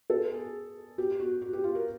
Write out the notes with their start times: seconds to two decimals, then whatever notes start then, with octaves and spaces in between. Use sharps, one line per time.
0.10 A4
0.32 G#4
0.98 G4
1.20 F#4
1.42 F#4
1.53 G4
1.64 F4
1.75 A#4